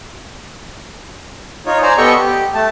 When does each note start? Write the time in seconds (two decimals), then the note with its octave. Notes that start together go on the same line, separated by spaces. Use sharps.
1.66 D#4 F4 C#5
1.82 C5 D5 G#5 A#5
1.97 B3 G4 A4 D#5 G5 C#6
2.19 G4
2.55 A3 A5